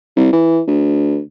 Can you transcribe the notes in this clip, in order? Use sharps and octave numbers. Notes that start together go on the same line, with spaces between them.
C2
E3
D2